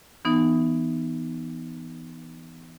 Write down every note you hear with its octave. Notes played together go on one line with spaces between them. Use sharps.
E3 B3 D#4